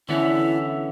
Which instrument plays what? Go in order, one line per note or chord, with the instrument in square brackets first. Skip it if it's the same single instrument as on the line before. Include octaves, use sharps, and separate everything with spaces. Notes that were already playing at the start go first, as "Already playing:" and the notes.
[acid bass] D3 [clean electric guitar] E3 B3 C#4 [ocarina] E4 [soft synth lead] E5